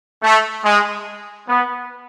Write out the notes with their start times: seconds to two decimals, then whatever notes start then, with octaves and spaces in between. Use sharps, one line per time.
0.23 A3
0.65 G#3
1.48 B3